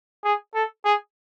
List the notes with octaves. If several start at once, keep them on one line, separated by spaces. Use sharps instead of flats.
G#4
A4
G#4